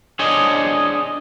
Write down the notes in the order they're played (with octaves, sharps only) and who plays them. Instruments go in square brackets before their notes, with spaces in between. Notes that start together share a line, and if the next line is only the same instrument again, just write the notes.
[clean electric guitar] D4 G#4 C5 C#5 D#5